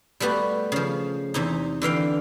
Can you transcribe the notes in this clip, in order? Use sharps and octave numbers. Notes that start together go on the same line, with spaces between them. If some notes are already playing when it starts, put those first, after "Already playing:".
G3 A3 B3 F#4 G4
C#3 F3
E2 C3 D#4
D3 E3 F5 G5